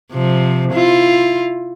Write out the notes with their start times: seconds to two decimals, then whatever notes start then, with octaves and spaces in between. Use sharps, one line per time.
0.12 C3 F3
0.72 E4 F4